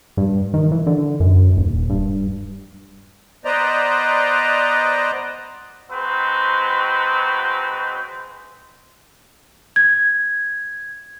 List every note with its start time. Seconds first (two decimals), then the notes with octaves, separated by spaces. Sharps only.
0.17 G2
0.54 D#3
0.72 E3
0.87 D3
1.20 F#2
1.57 D#1
1.90 G2
3.45 B3 B4 C5 D5 D#5 A#5
5.90 F#3 G#3 C4 D#4 F#4 B4
9.76 G#6